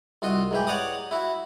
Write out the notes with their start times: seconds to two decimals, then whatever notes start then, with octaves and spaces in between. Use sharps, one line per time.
0.22 C2 F4 F#4 D#5
0.51 G#2 E3 G4
0.67 C#5 D5 F#5 A#5 D6 D#6
1.11 E4 F#4